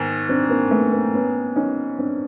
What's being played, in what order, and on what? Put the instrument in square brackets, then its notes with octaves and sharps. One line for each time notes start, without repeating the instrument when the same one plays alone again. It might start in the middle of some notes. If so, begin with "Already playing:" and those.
Already playing: [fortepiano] G#2 D#3 [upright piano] B3
[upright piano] C4 D4
A#3 C4
A3 B3
A#3 C4
B3 C#4
C#4 D#4
C4 D4